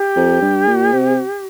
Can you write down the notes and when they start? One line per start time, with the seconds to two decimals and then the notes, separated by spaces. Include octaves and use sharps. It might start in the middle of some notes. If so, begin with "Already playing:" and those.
Already playing: G4
0.16 F2
0.41 G2
0.67 A#2
0.93 C3